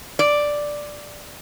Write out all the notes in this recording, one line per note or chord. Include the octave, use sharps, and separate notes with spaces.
D5